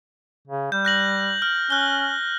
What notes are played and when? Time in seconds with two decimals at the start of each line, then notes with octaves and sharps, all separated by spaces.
0.47 C#3
0.72 G3 G6
0.85 F#6 A#6 F#7
1.42 F6
1.70 C#4 F#6 G7